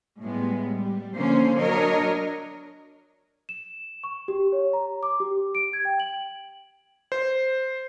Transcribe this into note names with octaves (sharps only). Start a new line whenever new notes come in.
A2 G3 G#3 B3
G3
D3 F3 A#3 C#4 C5
F#3 D4 A#4 C#5 D#5
E7
C#6
G4
C#5
A#5
D6
G4
D7
G#6
G5
F#7
C5